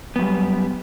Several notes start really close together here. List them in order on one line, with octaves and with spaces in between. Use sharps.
B3 F#2 G3